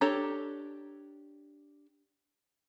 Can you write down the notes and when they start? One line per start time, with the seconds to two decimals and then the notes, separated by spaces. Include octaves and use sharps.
0.01 D4 G4 A4 C#5 A#5